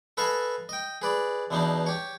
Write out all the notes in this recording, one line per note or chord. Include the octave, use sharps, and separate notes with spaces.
A4 B4 D#5 F5 G#5 A5
D#5 G5
G#4 B4 D5
E2 B2 E3 B3 D4 D#4
G4 C#5